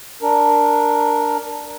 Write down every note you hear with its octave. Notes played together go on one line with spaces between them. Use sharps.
D4 A#4